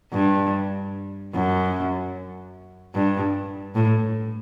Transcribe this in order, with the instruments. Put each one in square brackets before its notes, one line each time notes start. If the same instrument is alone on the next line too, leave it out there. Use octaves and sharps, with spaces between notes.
[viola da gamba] G2
F#2
G2
A2